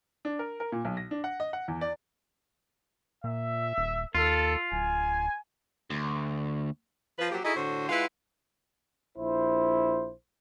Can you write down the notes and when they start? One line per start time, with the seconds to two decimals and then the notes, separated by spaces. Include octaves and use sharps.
0.25 D4
0.39 A#4
0.60 A#4
0.72 A#2
0.85 B1
0.97 A#6
1.11 D4
1.24 F#5
1.40 D#5
1.53 F#5
1.68 E2
1.81 D5
3.24 A#2 E5
3.78 D#1
4.15 D#2 F4 A4
4.72 D1 G#5
5.90 D2
7.19 F3 B4
7.30 F3 F#3 A#3 G4
7.43 D#4 E4 F#4 G#4 A4 D#5
7.55 A2 D3 F#4 C5
7.89 G#3 E4 F4 B4 F#5
9.17 A#1 E4 C5